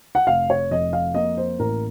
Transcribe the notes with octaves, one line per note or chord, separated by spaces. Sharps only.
F#5
F1 F5
C#5
F2 D#5
F5
A#3 D#5
C5
A1 A#4